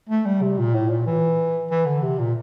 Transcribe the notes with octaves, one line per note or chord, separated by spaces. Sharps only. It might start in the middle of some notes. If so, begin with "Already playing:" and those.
A3
G3
C3
A#2
A2
A#2
E3
E3
D3
C3
A#2